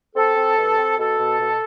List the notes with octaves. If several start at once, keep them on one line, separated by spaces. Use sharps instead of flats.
C4 A4
C4
G2
C4
B2 A4
B2
B2